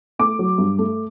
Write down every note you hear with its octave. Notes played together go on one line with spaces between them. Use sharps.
A3 D6
F#3
G2
A3